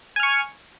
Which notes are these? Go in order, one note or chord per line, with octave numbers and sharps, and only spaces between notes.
G#5 C#6 F6